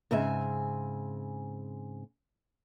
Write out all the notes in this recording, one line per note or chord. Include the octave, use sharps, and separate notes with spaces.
G#2 C#3 C4 E5 G#5